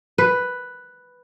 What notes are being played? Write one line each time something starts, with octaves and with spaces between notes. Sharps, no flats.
B4